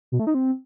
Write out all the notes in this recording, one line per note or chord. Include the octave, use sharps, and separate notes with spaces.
B2
A3
D#4
C4